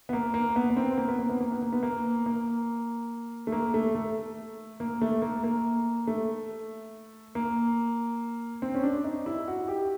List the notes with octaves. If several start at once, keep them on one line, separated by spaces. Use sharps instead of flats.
B3
A#3
A#3
B3
B3
C4
A#3
B3
A#3
B3
A#3
B3
A#3
B3
A#3
A#3
A3
A#3
A3
A3
A#3
A3
A#3
A#3
A3
A#3
C4
C#4
D4
D#4
E4
F#4
G4